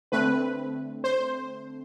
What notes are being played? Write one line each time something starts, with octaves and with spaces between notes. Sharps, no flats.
D3 A3 C4 B4
C5